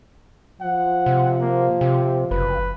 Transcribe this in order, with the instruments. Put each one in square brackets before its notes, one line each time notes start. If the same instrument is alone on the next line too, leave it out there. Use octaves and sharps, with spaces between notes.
[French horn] F3 [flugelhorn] F#5
[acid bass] C3
[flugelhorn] A#3
[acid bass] C3 [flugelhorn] G4
[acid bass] F#1 [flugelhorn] B4